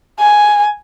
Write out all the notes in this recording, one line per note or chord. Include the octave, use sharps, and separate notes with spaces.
G#5